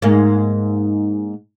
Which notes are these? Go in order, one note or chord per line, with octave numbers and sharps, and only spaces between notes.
G#2 A#3